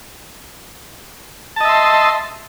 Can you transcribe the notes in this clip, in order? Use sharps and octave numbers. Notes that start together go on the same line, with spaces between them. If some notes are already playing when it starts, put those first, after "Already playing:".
D#5 E5 A5 C6